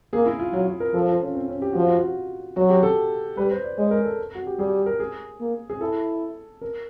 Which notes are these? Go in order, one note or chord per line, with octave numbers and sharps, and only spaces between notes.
A#3 G#4
E4
F4
F#3 F4
F4
A#4
F3 A4
F4
C#4
C4
C#4
G4
F3 F#4
F4
F#4
F#3 F#4
G4
A4
G3 B4
C5
D5
G#3 C#5
A#4
A4
F#4
G4
G3 G#4
A#4
G#4
A#3
G#4
E4 A4
A#4